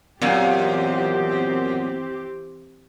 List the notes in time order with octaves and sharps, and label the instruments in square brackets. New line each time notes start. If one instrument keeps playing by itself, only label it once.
[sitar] F#2 A#2 [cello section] E3 C4 G4 [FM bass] B3